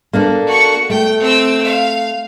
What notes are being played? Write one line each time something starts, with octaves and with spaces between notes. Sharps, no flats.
A#3 D4 A4
F#4 C#6
A3 G5
C4 E6
F5